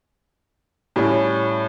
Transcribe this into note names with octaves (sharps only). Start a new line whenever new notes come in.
A2 G3 C#4